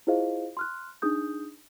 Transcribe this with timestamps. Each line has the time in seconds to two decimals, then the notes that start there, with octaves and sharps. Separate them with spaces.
0.07 E4 F4 G#4 C5 D#5 F5
0.57 C6 F6 F#6
1.02 D4 D#4 G#4 D#6 G6